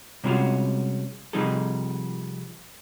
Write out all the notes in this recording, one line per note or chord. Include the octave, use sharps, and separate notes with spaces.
C3 G3 G#3 C#4 F4 F#4
C3 F3 G3 D#4 G#4 A4